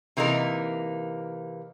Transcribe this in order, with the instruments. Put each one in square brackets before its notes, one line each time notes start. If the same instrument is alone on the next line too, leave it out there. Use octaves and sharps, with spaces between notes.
[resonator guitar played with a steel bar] C3 E3 A#3 D#4 A#4